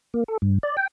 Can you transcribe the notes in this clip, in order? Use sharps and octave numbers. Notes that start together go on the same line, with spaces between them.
A#3
A4
G2
D5
G5